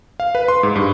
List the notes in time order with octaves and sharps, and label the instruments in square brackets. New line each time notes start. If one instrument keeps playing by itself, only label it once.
[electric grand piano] F5
B4
C6
G#2
G2